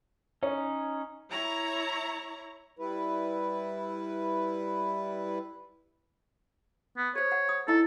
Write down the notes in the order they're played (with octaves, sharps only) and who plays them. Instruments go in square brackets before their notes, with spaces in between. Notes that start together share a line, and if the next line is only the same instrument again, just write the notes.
[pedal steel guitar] C#4 D#4 [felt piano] C#5
[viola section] E4 C#5 A#5
[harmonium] G3 E4 B4
[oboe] B3
[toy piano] A4 C5 [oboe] C#5
[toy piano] F#5
D#6
[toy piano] D#4 E4 D#5 [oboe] A4